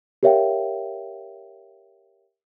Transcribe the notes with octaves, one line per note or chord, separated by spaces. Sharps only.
G4 A#4 C#5 E5 F5 G5